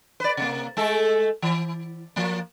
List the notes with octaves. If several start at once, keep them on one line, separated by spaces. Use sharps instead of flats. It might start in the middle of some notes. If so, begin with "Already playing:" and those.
B4 D5
C3 A#3
G#3 A3 A4
E3
F3 A#3